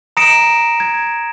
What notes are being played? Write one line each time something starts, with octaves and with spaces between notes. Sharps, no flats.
A#5 D#6 A#6 C#7 D7 E7
G#6